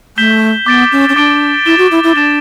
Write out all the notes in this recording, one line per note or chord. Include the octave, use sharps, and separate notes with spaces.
A3 G6 B6 E7 G7
B3 D6 A6 D7 G7
C#4
C#4
D4 D6 A6 D7 G7
E4 A6 E7 G7
F#4
E4
E4
D4 A6 E7 G7